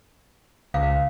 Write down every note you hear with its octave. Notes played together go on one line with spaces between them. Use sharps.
C#2 F5